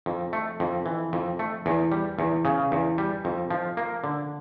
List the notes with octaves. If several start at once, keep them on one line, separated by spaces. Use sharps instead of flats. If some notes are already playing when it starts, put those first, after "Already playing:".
F2
A3
F2
E3
F2
A3
E2
G3
E2
C#3
E2
G3
F2
F3
A#3
D3